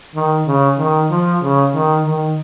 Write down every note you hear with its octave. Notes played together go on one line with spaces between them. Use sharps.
D#3
C#3
D#3
F3
C#3
D#3
D#3